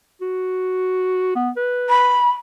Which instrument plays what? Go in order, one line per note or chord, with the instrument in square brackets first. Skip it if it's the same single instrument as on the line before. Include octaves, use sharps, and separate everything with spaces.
[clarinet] F#4
B3
B4
[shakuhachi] B5